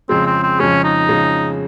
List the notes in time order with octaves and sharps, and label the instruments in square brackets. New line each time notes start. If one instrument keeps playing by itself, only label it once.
[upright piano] F2 C#3 G#3 [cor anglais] C4
[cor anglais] C4
C4
[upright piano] F2 C#3 G#3 [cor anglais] C#4
[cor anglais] D#4
[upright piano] F2 C#3 G#3